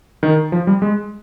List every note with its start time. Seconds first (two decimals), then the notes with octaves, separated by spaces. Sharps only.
0.23 D#3
0.52 F3
0.67 G3
0.82 G#3